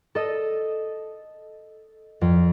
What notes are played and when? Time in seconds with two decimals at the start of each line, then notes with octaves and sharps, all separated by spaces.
0.15 A4 D#5
2.21 F2